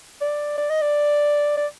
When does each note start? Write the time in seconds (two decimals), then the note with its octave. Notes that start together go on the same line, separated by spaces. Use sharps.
0.21 D5
0.58 D5
0.70 D#5
0.82 D5
1.58 D5